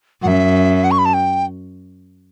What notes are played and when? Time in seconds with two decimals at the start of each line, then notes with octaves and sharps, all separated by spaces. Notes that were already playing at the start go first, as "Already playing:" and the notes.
0.23 F#2 E5 F#5
0.84 F#5
0.91 C#6
0.98 B5
1.05 A5
1.14 G5